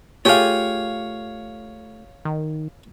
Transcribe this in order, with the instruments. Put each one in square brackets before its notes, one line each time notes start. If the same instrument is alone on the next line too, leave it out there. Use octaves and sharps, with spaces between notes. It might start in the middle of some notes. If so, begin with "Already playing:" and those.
[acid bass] A3 [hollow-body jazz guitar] F4 G4 G#4 [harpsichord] C#5 F5
[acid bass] D#3